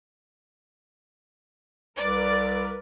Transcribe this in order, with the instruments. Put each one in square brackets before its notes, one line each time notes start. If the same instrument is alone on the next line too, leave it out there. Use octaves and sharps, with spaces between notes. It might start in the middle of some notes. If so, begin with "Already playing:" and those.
[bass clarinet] C2 [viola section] A#4 B4 [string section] D5